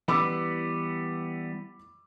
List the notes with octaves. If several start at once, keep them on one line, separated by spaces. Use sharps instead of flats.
E3 G3 B3 B5 D6 E6